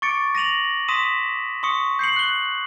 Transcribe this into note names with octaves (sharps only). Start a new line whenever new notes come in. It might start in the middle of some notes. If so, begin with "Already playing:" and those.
C#6 D6 A6 C#7 D7
A#6 D#7 F7 F#7
C6 D#6 A#6 B6 D#7 E7
C6 C#6 D#6 C#7
G6 C7 C#7 F#7
F#6 G7